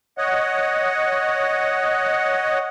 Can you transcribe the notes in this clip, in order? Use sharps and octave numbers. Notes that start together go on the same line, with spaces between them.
C#5 D#5 F#5